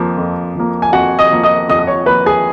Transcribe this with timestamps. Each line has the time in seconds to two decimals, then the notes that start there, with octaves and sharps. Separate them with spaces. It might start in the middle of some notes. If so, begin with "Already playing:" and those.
Already playing: F2 F3 A#3
0.17 F2
0.55 F3 A#3
0.82 G#5
0.93 F2 F#4 F#5
1.19 D#5 D#6
1.31 F3 A#3
1.44 D#5 D#6
1.68 F2 D#5 D#6
1.79 D#6
1.87 C#5 C#6
2.06 F3 A#3 B4 B5
2.26 G#4 G#5